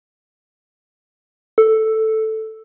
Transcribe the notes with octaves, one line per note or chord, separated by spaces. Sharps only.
A4